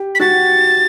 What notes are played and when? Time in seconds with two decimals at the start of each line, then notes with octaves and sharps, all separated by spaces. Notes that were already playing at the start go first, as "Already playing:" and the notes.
Already playing: G4
0.15 B6
0.20 F#4 F#5 A6